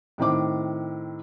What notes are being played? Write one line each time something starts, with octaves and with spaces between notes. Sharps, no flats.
A2 D#3 C4 D6